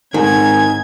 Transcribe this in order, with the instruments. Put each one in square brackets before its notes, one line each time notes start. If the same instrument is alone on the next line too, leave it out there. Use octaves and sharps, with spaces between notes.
[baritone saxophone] G#2 [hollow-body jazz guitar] D#3 [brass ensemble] C4 G#5 [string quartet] G#6